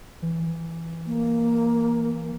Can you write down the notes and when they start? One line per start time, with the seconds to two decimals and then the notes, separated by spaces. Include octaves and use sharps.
0.22 E3
1.07 A#3